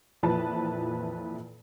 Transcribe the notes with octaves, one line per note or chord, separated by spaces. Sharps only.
F2 A#2 E3 F3 B4 A5